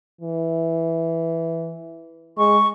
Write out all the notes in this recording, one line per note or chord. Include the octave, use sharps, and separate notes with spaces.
E3
G#3 C#6